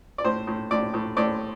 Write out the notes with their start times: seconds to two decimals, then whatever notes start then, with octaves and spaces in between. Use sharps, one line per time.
0.18 D5
0.25 A2 C5
0.47 A2
0.71 A2 D5
0.94 A2
1.17 A2 D5